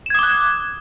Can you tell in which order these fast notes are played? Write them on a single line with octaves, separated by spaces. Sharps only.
E7 G#6 D#6 D6 F#6